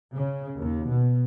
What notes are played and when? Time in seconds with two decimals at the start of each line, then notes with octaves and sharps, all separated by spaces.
0.17 C#3
0.59 D#2
0.88 B2